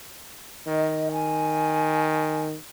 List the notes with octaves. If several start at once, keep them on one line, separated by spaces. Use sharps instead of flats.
D#3 D#5
G#5